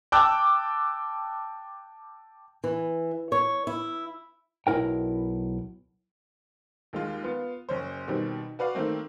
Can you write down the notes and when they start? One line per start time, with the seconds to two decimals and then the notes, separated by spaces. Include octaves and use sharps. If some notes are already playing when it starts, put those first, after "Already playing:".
0.12 G5 A5 D6 E6 F#6
2.64 E3
3.32 C#5
3.67 E4
4.67 B1 E4 A#4 G5
6.93 D#2 G#3 F4
7.24 B3 F4
7.69 F#1 C#4 C5
8.07 B2 D#3 G3 C4
8.59 F#4 B4 D5 F5
8.75 D#3 A3 A#3 C4